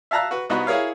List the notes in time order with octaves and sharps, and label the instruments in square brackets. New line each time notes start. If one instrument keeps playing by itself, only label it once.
[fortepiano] E5 F5 A5 A#5 E6 F#6
F#4 B4
C2 B3 D#4 F#4 B5
E4 G#4 A#4 C#5 F5